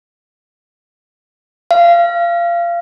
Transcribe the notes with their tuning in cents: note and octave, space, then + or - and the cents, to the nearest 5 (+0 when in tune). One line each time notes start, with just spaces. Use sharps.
F5 -25